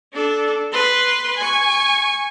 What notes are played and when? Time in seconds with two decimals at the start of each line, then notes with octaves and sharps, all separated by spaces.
0.14 D4 A4
0.73 B4 C6
1.37 G#5 C#6